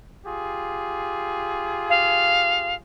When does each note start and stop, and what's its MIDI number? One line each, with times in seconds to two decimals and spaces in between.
0.26 2.80 65
0.26 2.80 67
0.26 2.80 68
1.89 2.75 77